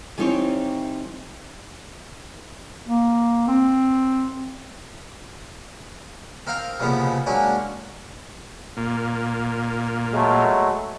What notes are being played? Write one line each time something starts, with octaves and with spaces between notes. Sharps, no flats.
E3 G3 C4 D#4 C5 C#5
A#3
C4
C4 A#4 D#5 F5 G5
C2 F2 A#2 C#3 F3 B3
F#3 G#3 A#3 C#4 D4
A#2
F#3 G#3 A3